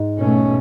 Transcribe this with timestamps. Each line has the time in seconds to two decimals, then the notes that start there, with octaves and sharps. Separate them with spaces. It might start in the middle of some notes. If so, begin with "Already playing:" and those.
Already playing: G#2
0.19 B2 A3 C#4